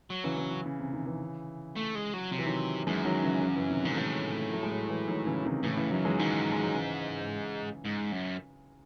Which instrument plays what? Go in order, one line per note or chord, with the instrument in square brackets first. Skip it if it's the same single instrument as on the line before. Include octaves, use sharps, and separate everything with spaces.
[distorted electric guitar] F#3
[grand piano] C#3 E3
C#3 E3
C#3
C#3
C3
C3 D#3
C#3 E3
[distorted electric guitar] A3
G#3
F#3
[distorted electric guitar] C3 [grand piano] F#3
[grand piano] E3
D#3 F#3
[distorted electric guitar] F#2 [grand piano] E3 G#3
[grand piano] D#3 F#3
C#3 E3
C#3 E3
C#3 E3
C3 D#3
[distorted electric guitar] G#2 [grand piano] D#3 F#3
[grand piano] A3
[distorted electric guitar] A2 [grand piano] E3 G#3
[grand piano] F#3 A3
G#3
F#3 A3
E3 G#3
D#3 F#3
C#3 E3
C3 D#3
[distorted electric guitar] A2 [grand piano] C#3 E3
[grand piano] C#3 E3
[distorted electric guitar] F#2 [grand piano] D#3 F#3
[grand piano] E3 G#3
[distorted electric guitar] G#2 [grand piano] D#3 F#3
[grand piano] G#3
F#3
C#3 E3
[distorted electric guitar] G#2
F#2